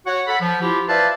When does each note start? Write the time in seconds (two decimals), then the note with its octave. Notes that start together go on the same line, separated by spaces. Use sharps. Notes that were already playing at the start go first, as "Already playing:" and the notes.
0.06 F#4 C#5 F#5
0.27 A4 F#5 B5
0.41 F3
0.62 E4 F4 G4
0.88 B4 C5 D5 E5 F5 A5